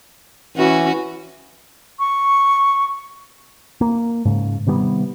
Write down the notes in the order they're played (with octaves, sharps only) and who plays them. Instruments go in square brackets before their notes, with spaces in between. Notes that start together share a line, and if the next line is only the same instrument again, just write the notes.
[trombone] E3 [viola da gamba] C#4 F#4
[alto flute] C#6
[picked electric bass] A#3
G#2 C#3
C3 D#3 G3 B3